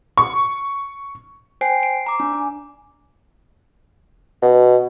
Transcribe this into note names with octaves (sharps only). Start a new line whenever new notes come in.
C#6
C5 G5 G#5 C7 D7
C7 D7
A#5 D6
D4
G#5
B2